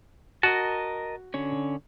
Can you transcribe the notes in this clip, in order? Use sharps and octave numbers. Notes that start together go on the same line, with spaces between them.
F#4 A#4 D#5 A5
D3 C#4 C#5